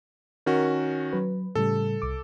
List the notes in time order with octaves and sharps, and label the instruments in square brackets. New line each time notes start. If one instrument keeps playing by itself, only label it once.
[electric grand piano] D#3 C#4 F#4 [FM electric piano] A#4
[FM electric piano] F#3 B4
[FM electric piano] A2 C#3 G3 [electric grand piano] A4
[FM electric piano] C2 D6